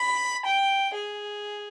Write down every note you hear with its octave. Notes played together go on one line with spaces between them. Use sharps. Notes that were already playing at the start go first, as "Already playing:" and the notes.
Already playing: B5
G5
G#4